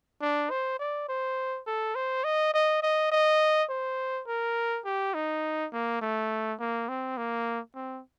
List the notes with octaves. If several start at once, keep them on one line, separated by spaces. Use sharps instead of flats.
D4
C5
D5
C5
A4
C5
D#5
D#5
D#5
D#5
C5
A#4
G4
D#4
A#3
A3
A#3
C4
A#3
C4